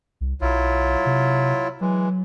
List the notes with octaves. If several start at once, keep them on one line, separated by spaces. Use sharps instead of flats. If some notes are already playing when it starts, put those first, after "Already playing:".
C2
B1 F#3 E4 F4
C3
E3 F#3 G#3